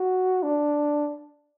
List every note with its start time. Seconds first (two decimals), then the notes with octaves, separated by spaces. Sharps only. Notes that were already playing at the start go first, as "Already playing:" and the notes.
Already playing: F#4
0.43 D4